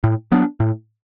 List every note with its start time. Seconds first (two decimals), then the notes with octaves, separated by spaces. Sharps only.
0.04 A2
0.32 F#3 B3 D4
0.60 A2